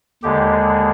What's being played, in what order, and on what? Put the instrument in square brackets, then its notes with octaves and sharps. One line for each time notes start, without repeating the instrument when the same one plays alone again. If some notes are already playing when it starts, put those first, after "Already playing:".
[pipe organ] D#2 D3 G#3 G4